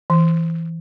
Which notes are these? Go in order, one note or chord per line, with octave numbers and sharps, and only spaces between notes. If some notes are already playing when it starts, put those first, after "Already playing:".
E3